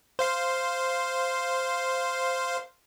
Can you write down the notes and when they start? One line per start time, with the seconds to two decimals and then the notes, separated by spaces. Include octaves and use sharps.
0.19 C5 F5 C6